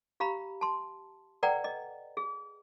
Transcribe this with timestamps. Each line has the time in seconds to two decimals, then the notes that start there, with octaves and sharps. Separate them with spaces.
0.20 G4 F5 A#5 B5
0.61 A5 C6
1.43 A4 B4 D5 F#5 G5 A#5
1.64 D#5
2.17 G#4